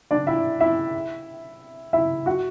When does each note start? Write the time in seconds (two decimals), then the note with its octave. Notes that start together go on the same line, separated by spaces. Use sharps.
0.11 D4 D5
0.27 E4 E5
0.60 E4 E5
1.93 E4 E5
2.26 F#4 F#5